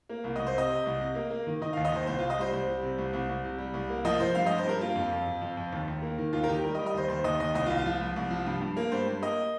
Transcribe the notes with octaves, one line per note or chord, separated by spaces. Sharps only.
A#3
C2
D#5
C2
C5
C3 D#5
C3
C2
C3
A#3
A#3
D#3
D#3 D#5
F5
D#2
D#5
D#2 C5
C2 C5
F4
C2
D#5
G3 C5
C2 C5
G3
C3
C2
C2
C2
C3
G3
C2
A#3
F3 D#5
F3 C5
G2 F5
D#5
G2
C5
G2 A#4
A#3 F4
F2
F2
F2
F2
F2
D#2
D#2
A#3
D#3
D#2 F4
A#4
D#3 G4
G3 A#4
D#5
G3
D#5
D#2 C5
D#2 C5
D#2 D#5
D#2 D#5
C2 D#5
F4
C2
F4
F3
C2
C2
F3
G2
G2
A#3
G2 C5
G2
A#3 D#5